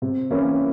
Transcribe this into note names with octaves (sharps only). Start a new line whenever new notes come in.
C3
E3 A#3 C#4 E4